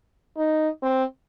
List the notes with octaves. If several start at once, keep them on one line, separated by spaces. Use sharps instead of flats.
D#4
C4